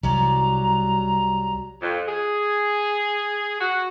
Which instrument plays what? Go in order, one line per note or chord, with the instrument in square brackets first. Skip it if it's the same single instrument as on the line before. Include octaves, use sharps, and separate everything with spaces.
[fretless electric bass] C2 [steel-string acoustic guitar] F#3 G3 [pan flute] A#5
[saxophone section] F2
G#4
F#4